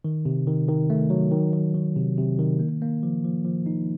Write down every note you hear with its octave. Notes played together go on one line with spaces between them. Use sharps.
D#3
C3
D#3
D#3
A3
F#3
D#3
D#3
D#3
C3
C3
D#3
A#3
A#3
F3
F3
F3
D#4